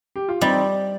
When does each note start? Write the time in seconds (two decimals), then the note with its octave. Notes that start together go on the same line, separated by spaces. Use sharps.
0.16 G4
0.29 F4
0.41 G3 C4 D#4